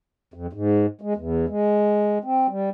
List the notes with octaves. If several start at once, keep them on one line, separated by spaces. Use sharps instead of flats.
F2
G#2
G#3
E2
G#3
C4
G3